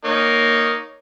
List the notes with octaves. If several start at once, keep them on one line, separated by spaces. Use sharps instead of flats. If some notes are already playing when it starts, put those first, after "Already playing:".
A#3 D#4 C#5